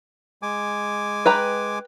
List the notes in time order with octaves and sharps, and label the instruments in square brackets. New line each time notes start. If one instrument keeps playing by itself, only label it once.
[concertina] G#3 G#5 D6
[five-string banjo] B4 G5 A#5